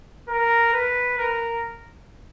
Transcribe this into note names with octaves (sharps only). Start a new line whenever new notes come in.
A#4
B4
A#4